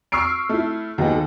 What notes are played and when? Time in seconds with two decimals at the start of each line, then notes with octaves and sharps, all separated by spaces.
0.12 C#6 E6 F6 C7 D7
0.49 A3 E4
0.98 D#2 F#3 B3 D#4 G#4
1.13 A4